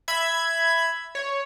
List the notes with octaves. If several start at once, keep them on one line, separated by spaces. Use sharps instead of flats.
E5 B5 G#6
C#5